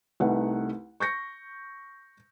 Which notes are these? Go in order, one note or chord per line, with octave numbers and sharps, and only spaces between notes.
C2 A3 D#4 B4 F#5
C#6 G6 A#6 C#7